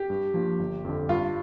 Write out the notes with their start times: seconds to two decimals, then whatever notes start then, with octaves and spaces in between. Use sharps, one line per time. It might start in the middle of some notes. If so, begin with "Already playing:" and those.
Already playing: G4
0.10 G2
0.34 F3 A#3 D4
0.59 G1
0.85 F2 D3
1.09 G2 F4